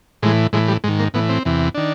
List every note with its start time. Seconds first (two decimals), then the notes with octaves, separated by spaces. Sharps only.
0.23 A2 E3 G#3
0.53 A2 E3 G#3
0.68 G3
0.84 G#2 D#3 G#3
0.99 A#3
1.14 A2 E3 B3
1.29 C4
1.45 E2 C3 E3
1.75 D#3 D4